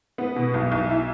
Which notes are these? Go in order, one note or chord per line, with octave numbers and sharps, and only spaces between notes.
B3
B2
B1
B1
E4